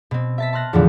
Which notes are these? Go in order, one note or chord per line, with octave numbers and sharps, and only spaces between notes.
B2 C4
E5 A5 B6
A5 C6 F6 F#6 A#6
E2 A2 D3 E3 F3